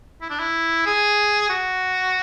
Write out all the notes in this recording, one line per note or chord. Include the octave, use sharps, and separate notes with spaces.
E4
D4
E4
G#4
F#4